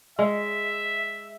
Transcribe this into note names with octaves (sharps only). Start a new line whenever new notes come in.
G#3 E5